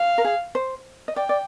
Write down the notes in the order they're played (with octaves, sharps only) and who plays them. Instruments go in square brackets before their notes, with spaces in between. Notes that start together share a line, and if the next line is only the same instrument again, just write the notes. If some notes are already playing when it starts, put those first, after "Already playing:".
Already playing: [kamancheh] F5
[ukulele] A#4
G#4
C5
D#5
[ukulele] D5 [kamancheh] G5
[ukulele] D5